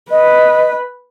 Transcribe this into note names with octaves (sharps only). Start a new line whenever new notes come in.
B4 D#5